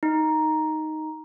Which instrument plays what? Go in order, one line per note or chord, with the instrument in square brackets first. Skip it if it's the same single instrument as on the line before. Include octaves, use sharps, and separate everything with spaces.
[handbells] D#4